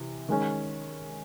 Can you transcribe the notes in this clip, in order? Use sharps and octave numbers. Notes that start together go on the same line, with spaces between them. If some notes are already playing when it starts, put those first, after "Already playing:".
Already playing: C3 E3
D#3 G#3 C#4